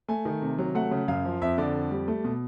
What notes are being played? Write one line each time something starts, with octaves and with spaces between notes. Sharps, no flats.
A3 G#5
D#3
C3
F#3
A3 F#5
C#3
F#2 F5
F3
F2 E5
D3 D5
F2
G3
A3
B2